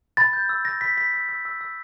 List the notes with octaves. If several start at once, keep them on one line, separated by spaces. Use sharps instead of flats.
B5 A6
G6
E6
E6 A#6
B5 B6
B5 B6
E6
E6
E6
E6